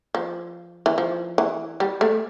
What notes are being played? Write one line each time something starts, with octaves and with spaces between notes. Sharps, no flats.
F3
E3
F3
E3
G3
A3